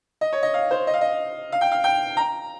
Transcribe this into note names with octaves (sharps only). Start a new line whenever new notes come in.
D#5
C#5
D#5
F5
C5
D#5
F5
D#5
F5
G5
F5
G5
A#5